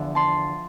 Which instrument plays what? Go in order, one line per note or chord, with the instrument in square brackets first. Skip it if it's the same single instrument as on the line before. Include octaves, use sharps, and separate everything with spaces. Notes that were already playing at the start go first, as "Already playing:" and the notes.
Already playing: [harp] E2 D3 F3 E5
A5 C6